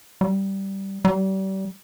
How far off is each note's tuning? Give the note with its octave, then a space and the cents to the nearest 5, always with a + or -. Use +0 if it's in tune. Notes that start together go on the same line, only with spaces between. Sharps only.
G3 -10
G3 -35